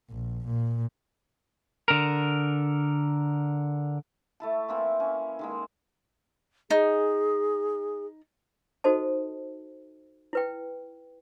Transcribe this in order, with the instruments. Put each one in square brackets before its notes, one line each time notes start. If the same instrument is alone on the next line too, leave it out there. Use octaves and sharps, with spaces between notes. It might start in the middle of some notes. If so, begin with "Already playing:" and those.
[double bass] A#1
A#2
[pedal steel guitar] D3 A#4
[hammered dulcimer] A3 E4 A5
E3 A#3 C4
C#4
D#3 G#3 A#3
[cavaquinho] D#4 [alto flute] G#4
[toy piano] D#4 F#4 A4 C5 D#5 A5
E4 B4 G5